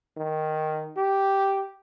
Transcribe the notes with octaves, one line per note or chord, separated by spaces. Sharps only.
D#3
G4